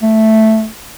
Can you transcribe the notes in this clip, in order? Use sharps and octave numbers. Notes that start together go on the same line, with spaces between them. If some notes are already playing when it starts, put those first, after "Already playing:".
A3